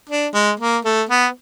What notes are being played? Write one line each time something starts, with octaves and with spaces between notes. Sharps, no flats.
D4
G#3
A#3
A3
B3